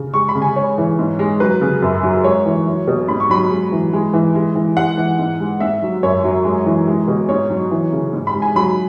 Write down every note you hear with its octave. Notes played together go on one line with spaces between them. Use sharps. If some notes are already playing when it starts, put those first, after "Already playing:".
Already playing: C#3
G#3 C#6
B5
C#3
G#5
G#3 C#5
E3
G#2
G#3
F#3 B4
C#3
F#2
F#3
G#3 C#5
E3
F#3
B2
G#2 B5
C#6
F#3 B5
G#3
E3
G#3
E3
G#3
E3
G#3 F#5
E3
G#2
G#3
G#2 E5
F#3
F#2 C#5
F#3
G#3
E3
G#3
B2
G#2 C#5
F#3
E3
C#3
G#2
B5
G#3
G#5
F#3 B5